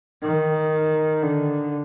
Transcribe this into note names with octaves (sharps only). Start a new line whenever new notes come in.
D#3
D3